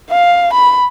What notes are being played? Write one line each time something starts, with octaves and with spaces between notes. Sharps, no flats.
F5
B5